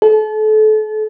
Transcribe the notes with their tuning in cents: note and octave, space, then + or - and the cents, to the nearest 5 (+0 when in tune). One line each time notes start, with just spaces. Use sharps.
A4 -35